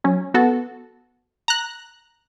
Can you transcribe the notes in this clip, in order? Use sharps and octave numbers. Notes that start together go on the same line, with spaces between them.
F#3 C#4
B3 F#4 A4
A#5 F#6